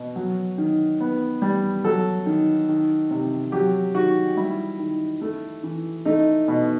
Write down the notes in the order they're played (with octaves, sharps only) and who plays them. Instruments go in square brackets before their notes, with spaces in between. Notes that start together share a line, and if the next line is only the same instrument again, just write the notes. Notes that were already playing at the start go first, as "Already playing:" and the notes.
Already playing: [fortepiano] B2
F#3
D#3
B3
G3
F#3 A4
D#3
D#3
C3
F#3 G4
D#3 F#4
G3 E4
D#3
A3
E3
A3 D#4
B2